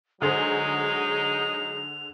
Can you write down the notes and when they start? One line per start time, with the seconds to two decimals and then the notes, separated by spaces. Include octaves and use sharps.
0.22 D3 F#3 G#3 D#4 G#4 C5 F7